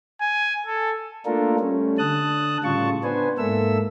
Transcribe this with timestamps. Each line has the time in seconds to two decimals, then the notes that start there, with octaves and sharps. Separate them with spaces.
0.21 G#5
0.66 A4
1.26 A3 A#3 D4 F4 A4 A#4
1.60 G3 A3 C#4
1.98 D3 A5 D#6 F#6
2.64 A2 C#3 G3 F4 A5 C#6
3.04 B3 D4 B4 C5 G#5
3.38 G#2 A#3 A4 E5 E6